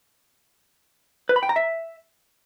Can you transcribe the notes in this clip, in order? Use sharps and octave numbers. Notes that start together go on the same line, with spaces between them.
B4
B5
G5
A#5
E5